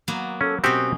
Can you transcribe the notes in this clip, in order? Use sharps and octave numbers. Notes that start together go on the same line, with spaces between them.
F#3 A#3 B3
C#4 A4
B2 C4 C#4 F#4 G4 D#6